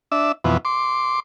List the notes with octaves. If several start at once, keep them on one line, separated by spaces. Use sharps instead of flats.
D4 E5
F2 B2 E3
C6 D6